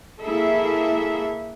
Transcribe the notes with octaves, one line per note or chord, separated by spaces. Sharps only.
A#3 E4 G#4 A4 E5